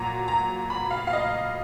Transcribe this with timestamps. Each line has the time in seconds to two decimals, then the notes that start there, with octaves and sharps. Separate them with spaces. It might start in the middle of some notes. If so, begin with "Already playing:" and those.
Already playing: A#2 F#3 A#5
0.28 A#5
0.70 B5
0.91 F5
1.07 F5
1.13 D#5